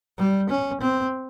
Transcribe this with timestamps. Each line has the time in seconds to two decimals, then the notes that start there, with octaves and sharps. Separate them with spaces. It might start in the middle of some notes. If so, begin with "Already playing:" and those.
0.18 G3
0.49 C#4
0.81 C4